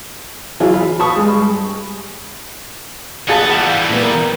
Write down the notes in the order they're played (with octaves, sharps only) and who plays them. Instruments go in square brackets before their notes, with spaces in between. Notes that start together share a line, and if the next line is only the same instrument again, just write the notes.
[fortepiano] E3 F#3 F4 G#4
F5 B5
A5 B5 C#6 D#6
G2 G#3
[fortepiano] A#1 G#4 A5 [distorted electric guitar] B3
[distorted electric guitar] E3 G3 [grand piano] F#5 G6
[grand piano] A#2 B3
A#4